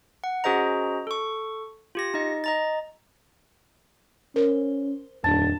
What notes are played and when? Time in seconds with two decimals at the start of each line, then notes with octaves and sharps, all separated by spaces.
0.24 F#5
0.44 C#4 F#4 G#4 C5 D#5 A#5
1.07 A4 C#6
1.95 F4 G4 A#6
2.14 D#4 D#5
2.44 D#5 A#5 A6
4.36 C#4 A#4 C5
5.24 D#1 F2 D4 A5